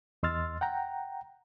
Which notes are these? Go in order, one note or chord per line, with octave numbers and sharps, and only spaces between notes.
E2 D#5 C6 E6 F6 A6
F#5 G5 A#5